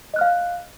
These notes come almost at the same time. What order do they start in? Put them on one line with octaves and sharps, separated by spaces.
D#5 F#6 F6 F5